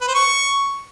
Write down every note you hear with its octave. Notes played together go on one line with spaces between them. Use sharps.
B4
C5
C#6